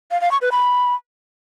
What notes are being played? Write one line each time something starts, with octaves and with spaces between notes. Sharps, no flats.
F5
F5
C#6
B4
B5